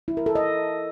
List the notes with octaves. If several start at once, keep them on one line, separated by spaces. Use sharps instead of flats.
E4
A#4
A4
D#5